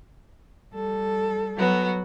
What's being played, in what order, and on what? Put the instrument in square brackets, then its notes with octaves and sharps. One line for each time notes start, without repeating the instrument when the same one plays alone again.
[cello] G3 A4
[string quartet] F#3 B3 F#4